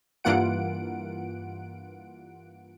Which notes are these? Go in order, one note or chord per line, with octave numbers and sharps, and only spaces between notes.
G2 E3 A#3 F4 F#5 D7